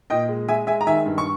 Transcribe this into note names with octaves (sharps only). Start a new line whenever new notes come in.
A#2 D#5 G5
G#3
G#3 E5 G#5
G#3 E5 G#5
A#5
D#3 E5 G#5
G2
C#6